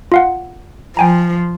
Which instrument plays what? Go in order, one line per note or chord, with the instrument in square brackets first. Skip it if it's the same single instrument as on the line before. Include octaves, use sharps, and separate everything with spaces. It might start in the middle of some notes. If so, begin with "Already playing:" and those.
[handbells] F4 F5 F#5
[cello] F3 [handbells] G5 G#5 A#5